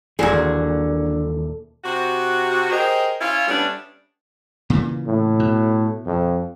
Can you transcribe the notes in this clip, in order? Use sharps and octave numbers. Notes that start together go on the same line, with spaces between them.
D#1 C2 A#2 D3 E3 F#4 G#4
C3 F#4
G4 G#4 A#4 C5 D#5
C#4 E4 F4
G3 A3 B3 C#4 D4
A#2 C#3 E3
A2
B2
F2